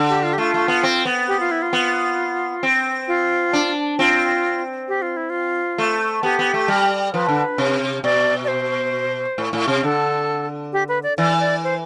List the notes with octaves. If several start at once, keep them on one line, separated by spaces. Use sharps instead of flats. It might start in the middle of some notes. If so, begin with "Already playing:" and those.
Already playing: D3
G4
F4
G4
A3 F4
A3
B3
C4
B3
G4
F4
E4
F4
B3
C4
F4
D4
C4 F4
G4
F4
E4
F4
A3
B3 G4
B3
A3
G3
F3 B4
D3
C3
B2 D5
D5
C5
A2
A2
C3
D3 A4
G4
B4
D5
E3 D5
D5
C5